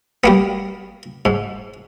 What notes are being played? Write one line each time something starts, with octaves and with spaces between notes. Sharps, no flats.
G3 A#3 B3
G#2